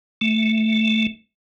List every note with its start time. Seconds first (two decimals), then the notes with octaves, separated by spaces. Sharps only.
0.21 A3